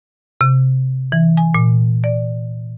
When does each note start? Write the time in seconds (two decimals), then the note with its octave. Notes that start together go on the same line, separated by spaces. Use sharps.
0.41 C3
1.12 E3
1.37 G#5
1.54 A#2
2.04 D5